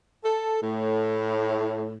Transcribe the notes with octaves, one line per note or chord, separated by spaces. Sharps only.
A4
A2